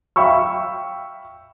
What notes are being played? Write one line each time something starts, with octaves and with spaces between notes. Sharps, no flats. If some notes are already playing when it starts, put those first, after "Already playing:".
E5 F5 G5 B5 C#6 E6